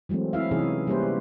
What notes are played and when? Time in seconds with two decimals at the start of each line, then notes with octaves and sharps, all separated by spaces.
0.09 E3 F#3 G#3 A3 C4
0.33 C4 E4 E5 F5
0.51 C3 E3 C#4 D#4 G#4
0.87 G3 A#3 C#4 G4 B4 C5